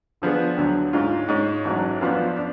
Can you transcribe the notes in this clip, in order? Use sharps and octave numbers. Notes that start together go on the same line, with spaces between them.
D3 F3 B3 D4 G#4
D2 D3 F#3
G#2 G#3 C#4 F4
G#2 G#3 C#4
A1 G#2 F#3
F#2 F3 B3 D4
D4